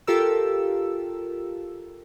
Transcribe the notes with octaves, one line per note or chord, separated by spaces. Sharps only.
F4 G4 A4 A#4 E6